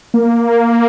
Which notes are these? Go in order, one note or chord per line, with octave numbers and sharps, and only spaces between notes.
A#3